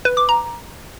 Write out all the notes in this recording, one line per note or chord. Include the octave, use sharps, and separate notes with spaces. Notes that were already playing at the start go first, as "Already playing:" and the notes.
B4
D6
A#5